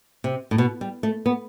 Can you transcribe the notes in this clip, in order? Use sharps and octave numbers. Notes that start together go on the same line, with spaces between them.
C3
A2
B2
G3
A3
B3